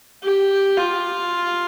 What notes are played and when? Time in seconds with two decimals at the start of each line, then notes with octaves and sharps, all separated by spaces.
0.23 G4
0.77 F4